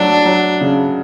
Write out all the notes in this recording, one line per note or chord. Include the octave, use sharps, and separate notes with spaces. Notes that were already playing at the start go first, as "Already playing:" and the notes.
Already playing: F#3 A3 D4
F#3
C#3